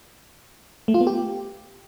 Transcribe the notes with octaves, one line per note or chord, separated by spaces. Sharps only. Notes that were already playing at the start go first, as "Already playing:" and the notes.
A3
F4
B3
G4